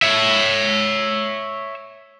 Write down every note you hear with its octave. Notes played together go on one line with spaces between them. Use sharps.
C#5 E5